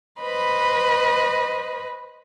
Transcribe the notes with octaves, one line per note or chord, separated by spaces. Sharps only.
B4 C5 D#5 B5